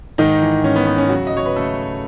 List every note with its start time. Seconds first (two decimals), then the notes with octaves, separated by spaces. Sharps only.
0.18 G#2 D#3 D#4
0.42 E3
0.64 G#2 C#4
0.76 B3
0.86 B3
0.98 C#4
1.09 C#3 F#3 F#4
1.27 D#5
1.33 F#3 C#5
1.46 B4
1.56 C#3 A3 A4